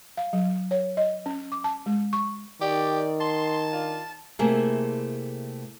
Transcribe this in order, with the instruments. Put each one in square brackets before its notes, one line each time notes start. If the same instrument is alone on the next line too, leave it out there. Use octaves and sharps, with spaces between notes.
[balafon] F5
F#3
C#5
D#5
C#4
D6
A5
G#3
C#6
[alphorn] D#3 [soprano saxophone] G4 [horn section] D5
[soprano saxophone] A5 [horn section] C6
[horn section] D4 F4
[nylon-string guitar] C3 A3 A#3 E4 G#4